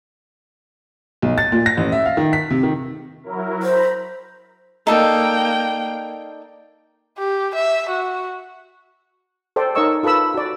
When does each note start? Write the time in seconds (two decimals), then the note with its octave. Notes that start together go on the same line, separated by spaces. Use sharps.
1.22 B1
1.38 A6
1.52 A#2
1.66 A#6
1.77 A1
1.92 E5
2.06 F5
2.17 D#3
2.33 B6
2.50 C3
2.63 D#3
3.23 F#3 E4 A#4
3.63 C5 A#5 B5
4.87 A#3 D#4 A4 D5 G5
7.18 G4
7.54 E5
7.89 F#4
9.56 A4 C5 D5 G5
9.75 D#4 A#4 C#5 D#5 C#6 E6
10.03 F4 A4 B4 B5 E6
10.34 F#4 D5